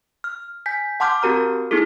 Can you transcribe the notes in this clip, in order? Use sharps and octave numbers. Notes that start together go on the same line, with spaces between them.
F6
G#5 G6 B6
F#5 A5 C6 D6 F6 G6
C4 F#4 G4 A#4 A#5 F6
B3 D#4 E4 G#4 A4